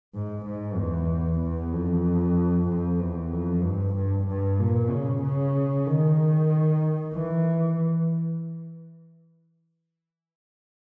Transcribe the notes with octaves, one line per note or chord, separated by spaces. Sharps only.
G#2
G#2
E2
E2
F2
F2
E2
F2
G2
G2
G2
A#2
C#3
C#3
D#3
E3